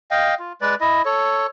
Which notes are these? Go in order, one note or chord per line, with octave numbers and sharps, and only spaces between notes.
D#5 F5 G5
F4
G#3 B4 D5
E4 D#5
A4 C#5